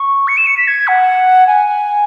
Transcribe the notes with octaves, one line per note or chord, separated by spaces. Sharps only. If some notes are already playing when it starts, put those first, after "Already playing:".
Already playing: C#6
C#7
E7
C#7
B6
G#6
F#5
G#5